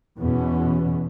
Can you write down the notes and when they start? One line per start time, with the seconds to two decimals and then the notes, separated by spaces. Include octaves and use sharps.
0.19 E2 B2 E3 B3 C#4